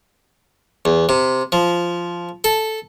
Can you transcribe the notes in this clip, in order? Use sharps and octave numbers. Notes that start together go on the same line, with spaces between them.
E2
C3
F3
A4